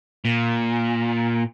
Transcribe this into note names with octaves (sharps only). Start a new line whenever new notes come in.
A#2